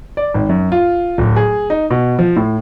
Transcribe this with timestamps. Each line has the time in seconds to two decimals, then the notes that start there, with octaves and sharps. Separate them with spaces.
0.17 D5
0.34 G#1
0.49 F#2
0.72 F4
1.18 D1
1.36 G#4
1.70 D#4
1.90 B2
2.19 F3
2.36 A2